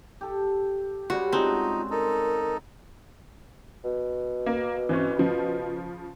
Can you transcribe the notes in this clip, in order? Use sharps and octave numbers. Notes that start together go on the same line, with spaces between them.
G4 A4
C#3 G3 F#4 C5
G#3 C4 D#4 F4 F#4 A5
D#4 A4 A#4
B2
A#3
E3 C4 C#4
C#3 F3